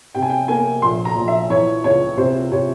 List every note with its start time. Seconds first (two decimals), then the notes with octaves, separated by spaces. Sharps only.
0.15 C3 G5
0.22 G#5
0.30 G5
0.48 A#3 G#5
0.82 A#1 C6
1.05 A#5
1.16 A#1
1.28 E5
1.50 E3 C#5
1.84 C#2 C#5
2.17 C3 C5
2.51 C3 C#5